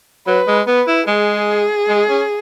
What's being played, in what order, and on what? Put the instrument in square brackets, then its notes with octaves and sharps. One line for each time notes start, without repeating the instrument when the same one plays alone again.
[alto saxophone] F#3 [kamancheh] B4
[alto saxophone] G#3
[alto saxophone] B3 [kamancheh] B4
[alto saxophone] E4
[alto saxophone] G#3 [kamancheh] G#4
[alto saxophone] G#3
C#4